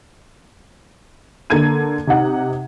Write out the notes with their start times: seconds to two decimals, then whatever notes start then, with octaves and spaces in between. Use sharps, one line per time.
1.50 D3 A#3 A4 G#6 D#7
2.07 C3 D#4 F#5